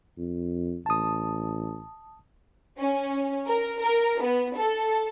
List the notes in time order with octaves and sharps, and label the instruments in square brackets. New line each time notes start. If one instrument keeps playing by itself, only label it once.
[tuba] F2
[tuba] A1 [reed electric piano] A5 D#6
[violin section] C#4
A#4
A#4
B3
A4